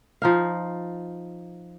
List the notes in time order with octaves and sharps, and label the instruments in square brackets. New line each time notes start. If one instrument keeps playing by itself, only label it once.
[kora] F3 D#4 F5